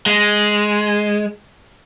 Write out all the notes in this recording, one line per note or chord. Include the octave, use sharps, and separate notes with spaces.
G#3